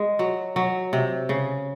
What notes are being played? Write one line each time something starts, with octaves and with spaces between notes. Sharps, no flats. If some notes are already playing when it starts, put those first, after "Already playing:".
Already playing: G#3
F#3
F#3
C3
C#3